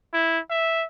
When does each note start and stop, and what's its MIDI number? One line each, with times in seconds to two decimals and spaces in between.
0.14 0.39 64
0.51 0.85 76